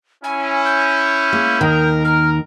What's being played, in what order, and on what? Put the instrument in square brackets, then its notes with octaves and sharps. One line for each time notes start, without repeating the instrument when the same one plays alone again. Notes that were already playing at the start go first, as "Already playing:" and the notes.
[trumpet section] C#4 E4 [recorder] G#5
[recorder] G6
[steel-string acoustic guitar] G#3 A#3
[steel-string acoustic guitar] D#2 D#3 [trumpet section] A#4
[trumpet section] A#4 [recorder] F6